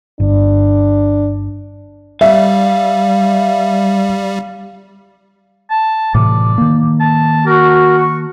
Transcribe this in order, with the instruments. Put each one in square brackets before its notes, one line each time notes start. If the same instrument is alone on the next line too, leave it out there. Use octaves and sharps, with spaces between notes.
[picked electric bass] G1 [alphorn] D4
[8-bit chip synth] G3 [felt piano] E5 [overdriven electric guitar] F5
[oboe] A5
[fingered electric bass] A2 C3 E3 [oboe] D5
[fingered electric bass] D#3 A#3
[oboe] A5
[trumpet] F#4 [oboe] A#4
[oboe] C#6